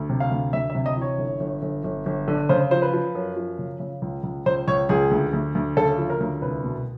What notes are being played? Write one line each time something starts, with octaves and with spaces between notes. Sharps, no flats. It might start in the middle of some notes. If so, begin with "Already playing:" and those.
Already playing: D2
C3
F5
D2
D2 E5
E5
C3
D#5
E3 C#5
G1
G1
G1
G1
G1
D3
C#3 C5
F3 C5
B4
F3
F#2
F3
C#3
C#3
C#2
C#2
C#2 C5
C#2 C#5
C#2 G#4
D2
D2
D2
C#3 A4
F3
A#4
D2
C2 B4
B2